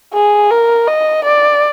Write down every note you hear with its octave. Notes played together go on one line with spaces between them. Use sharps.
G#4
A#4
D#5
D5